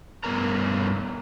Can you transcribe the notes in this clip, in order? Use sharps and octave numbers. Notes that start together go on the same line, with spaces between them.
G2 E3 B3 C#4 A#4 A#5